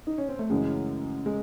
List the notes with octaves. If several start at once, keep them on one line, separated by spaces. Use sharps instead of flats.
D#4
C#4
C4
A3
F#2 C#3 E3 G#3
G#3